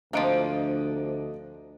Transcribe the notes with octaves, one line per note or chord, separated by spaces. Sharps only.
D2 F3 A#3 C4 D4 F4 D#5 D7